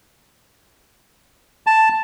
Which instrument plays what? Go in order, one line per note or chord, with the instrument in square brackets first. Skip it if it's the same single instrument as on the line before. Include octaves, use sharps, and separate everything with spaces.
[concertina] A5